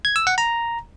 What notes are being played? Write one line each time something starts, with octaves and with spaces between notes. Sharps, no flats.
G#6
E6
F#5
A#5